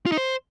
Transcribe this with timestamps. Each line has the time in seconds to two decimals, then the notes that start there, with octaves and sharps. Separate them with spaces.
0.06 F4
0.12 D#4
0.17 C5